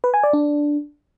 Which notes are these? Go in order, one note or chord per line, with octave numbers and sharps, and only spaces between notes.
B4
G#5
D5
D4